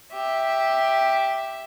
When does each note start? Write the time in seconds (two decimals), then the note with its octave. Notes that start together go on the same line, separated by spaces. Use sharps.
0.13 G4 E5